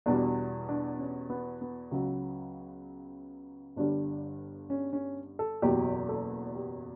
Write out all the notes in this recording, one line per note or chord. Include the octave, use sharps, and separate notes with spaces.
E2 B2 G3 D4
D4
C#4
B3
B3
C#2 C#3 F#3
G1 G2 D3 G3 D4
C#4
C#4
A4
F#1 E2 B2 F#3 G4
A4
G4